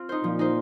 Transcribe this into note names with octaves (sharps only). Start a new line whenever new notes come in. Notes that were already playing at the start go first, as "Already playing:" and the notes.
Already playing: C4 F4
D#4 C5
A#2 F3
D#4 C5